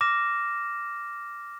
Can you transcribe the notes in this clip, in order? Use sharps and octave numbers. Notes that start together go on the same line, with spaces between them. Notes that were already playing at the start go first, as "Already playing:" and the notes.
D6 F6 A#6 E7